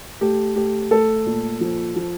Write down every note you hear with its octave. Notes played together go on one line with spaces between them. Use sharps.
A3 G4
A3 G4
A3 A4
A#2
F3
F3